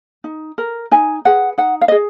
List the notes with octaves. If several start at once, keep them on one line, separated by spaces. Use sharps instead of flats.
D#4
A#4
D#4 G#5
G#4 B4 F#5
D#4 F#5
F5
D#5
G#4